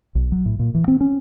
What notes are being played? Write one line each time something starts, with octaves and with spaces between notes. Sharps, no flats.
B1
F#3
A2
A#2
E3
C4
C#4